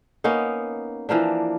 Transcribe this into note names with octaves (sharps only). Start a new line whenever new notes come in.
A#3 B3 C#4 D#4
E3 F3 A#3 D4